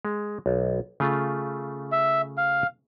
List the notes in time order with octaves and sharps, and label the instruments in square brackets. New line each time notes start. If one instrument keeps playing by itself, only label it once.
[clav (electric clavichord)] G#3
B1
C#3 A3 F4
[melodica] E5
F5